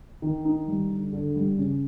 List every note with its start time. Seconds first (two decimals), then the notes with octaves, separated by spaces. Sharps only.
0.22 D#3
0.45 D#4
0.68 G3
0.90 D3
1.13 D3
1.36 G3
1.58 C#3